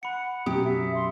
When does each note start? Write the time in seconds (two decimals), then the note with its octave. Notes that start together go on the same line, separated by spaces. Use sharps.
0.03 F#5 B5 C#7
0.46 F#2 B2 F#3 G4 D#6
0.64 E5
0.95 C6